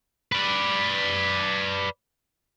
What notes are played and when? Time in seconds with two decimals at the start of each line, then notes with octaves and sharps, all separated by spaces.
0.32 B4 D5